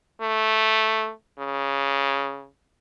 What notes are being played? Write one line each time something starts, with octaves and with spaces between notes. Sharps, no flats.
A3
C#3